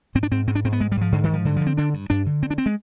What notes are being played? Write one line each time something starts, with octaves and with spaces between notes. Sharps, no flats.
G#2 C4
D4
G#2 C4
G#2 C4
D4
G#2 C4
B3
G#2 G#3
G3
G#2 F3
G#2 D3
D#3
G#2
F3
G2 D3
D3 F3
C4
D3 D4
G2
G2 D4
D3
D3 C4
D4
C4
G#3